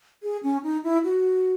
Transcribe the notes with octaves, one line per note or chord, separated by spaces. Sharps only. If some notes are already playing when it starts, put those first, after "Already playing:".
G#4
C#4
D#4
E4
F#4